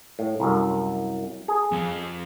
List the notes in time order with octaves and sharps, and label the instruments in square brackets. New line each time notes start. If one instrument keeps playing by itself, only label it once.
[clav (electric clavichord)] A2
C2 F#2
G#4
[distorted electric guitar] F2 F3